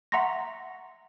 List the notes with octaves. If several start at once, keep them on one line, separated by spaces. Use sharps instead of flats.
E5 F#5 A#5 C6 C#6 A#6